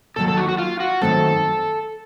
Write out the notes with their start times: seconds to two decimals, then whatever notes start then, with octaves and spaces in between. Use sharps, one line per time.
0.16 D#2 D#3 F#3 A4
0.28 A4
0.37 F#4
0.49 F#4
0.58 F4
0.80 F#4
1.01 F#2 D#3 F#3 A3 C4 A4